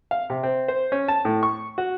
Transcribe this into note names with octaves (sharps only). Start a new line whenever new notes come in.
F5
C3
C4
C5
C#4
A5
A2
C#6
F#4